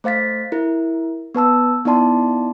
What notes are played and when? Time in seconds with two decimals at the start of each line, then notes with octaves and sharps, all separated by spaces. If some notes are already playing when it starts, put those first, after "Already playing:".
0.04 A3 C5 F5 A6 B6
0.52 E4 A#4
1.35 B3 B4 A5 E6
1.85 B3 D#4 E4 D5 A5 C6